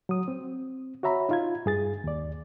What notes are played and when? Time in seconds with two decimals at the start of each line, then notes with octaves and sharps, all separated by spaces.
0.09 F#3 D#6
0.28 C4
1.03 F#4 C#5 E5 A#5 B5
1.29 D#4 F4 G#6
1.66 G2 G#4 A6
2.04 D#2 D5